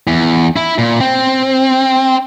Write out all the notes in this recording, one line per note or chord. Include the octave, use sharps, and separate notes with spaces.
E2
E4
A#2
C4